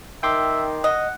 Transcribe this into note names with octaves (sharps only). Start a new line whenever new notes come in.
D#3 E5 G5 C6 D6
D#5 F#5